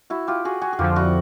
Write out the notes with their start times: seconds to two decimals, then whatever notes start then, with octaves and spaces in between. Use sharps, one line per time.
0.10 E4 F#4
0.27 F4 G4
0.45 F#4 G#4
0.61 F#4 G#4
0.73 G#4
0.79 F2 D3 F3 F4 G4
0.96 E4 F#4